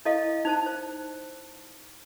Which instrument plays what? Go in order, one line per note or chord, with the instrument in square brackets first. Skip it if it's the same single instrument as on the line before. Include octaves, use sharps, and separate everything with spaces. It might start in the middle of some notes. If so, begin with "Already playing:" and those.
[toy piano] E4 A4 D#5 F5
D#4 C5 A5
C5